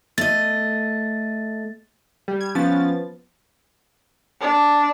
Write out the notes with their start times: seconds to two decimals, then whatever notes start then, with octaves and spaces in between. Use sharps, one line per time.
0.18 A3 D#5 A6
2.28 G3
2.41 G#6
2.55 F3 B3 C#4 A6
4.41 D4